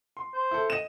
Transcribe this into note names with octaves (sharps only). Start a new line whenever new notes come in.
C6
C5
E4 A4
D#5 E7